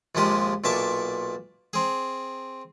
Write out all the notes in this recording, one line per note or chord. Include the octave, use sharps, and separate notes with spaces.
A#1 D#2 F3 G#3 G4 D#6
B1 A#2 E5 A5 C#6 D6
C4 G#4